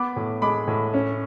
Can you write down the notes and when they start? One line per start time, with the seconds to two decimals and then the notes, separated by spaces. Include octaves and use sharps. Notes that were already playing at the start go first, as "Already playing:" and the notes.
Already playing: B3 B5 D6
0.16 A2
0.42 G#3 B5 D6
0.68 A2
0.94 C#4